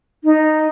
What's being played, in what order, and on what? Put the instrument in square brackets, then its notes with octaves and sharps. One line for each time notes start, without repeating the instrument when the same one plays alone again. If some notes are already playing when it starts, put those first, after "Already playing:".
[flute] D#4